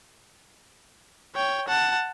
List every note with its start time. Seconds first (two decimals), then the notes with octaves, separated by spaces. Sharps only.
1.36 C#5 G5
1.68 F#5 A5